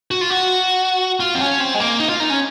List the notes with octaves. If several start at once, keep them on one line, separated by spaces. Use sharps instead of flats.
F#4
F4
F#4
F4
C4
C#4
C4
G#3
A#3
D#4
F4
D#4
C#4